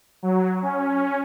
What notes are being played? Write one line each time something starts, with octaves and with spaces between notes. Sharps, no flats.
F#3
C#4